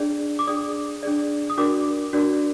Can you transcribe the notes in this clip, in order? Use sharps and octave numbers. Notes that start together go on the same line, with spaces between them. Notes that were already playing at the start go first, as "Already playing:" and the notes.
Already playing: D4 G#4 D5
D6
D4 G#4 D5 D#6
D4 G#4 D5
D#6
D4 F#4 A#4 D5 D6
D4 F#4 A#4 D5